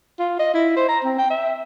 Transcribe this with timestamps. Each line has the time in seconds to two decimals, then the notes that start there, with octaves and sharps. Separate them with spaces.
0.19 F4
0.39 D#5
0.54 E4
0.76 C5
0.89 A#5
1.04 C4
1.19 G5
1.30 E5